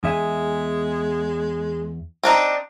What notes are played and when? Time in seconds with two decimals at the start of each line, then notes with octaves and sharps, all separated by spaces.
0.04 E2 G#3 E5 G#5
2.23 C4 D4 D#4